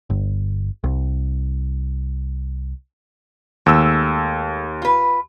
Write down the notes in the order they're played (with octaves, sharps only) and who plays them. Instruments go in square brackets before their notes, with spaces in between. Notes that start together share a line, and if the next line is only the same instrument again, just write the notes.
[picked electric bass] G1
C2
[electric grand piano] D#2 E6 [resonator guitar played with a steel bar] G#3 A3
[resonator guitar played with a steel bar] F4 B4